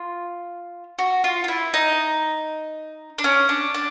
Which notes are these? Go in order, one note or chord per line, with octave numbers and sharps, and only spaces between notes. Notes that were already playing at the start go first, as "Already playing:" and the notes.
Already playing: F4
F#4
F4
F4
E4
D#4
D4
C#4
D4
D4